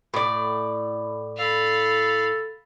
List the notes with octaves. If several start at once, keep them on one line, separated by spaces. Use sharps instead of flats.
A2 D5
A4 F5 B5